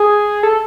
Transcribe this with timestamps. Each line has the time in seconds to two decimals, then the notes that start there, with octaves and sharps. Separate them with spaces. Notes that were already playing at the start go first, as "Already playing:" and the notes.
Already playing: G#4
0.43 A4